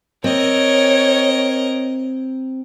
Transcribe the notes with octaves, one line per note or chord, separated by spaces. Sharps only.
C4 A#4 C#5 D#5